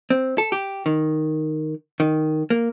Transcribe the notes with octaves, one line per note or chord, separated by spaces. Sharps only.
C4
A4
G4
D#3
D#3
A#3